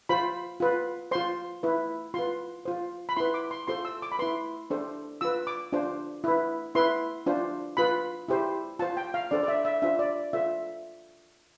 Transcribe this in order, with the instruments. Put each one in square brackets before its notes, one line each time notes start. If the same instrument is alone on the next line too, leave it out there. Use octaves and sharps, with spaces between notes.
[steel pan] F4 C5 B5
F4 B4
F4 C5 C6
E4 B4
F4 B4 C6
F4 C5
B5
E4 B4 C6
D6
C6
F4 A4 C5 C6
E6
D6
B5
E4 B4 C6
D4 A4 C5
F4 B4 E6
D6
D4 F4 C5
E4 B4
E4 B4 C6
D4 F4 C5
F4 B4 B5
E4 G4 C5
F4 C5 A5
G5
F5
D4 A4 C5 D5
D5
E5
E5
D4 F4 C5 E5
D5
F4 A4 C5 E5